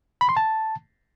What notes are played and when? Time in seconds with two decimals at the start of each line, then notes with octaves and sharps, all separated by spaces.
0.21 B5
0.29 C6
0.37 A5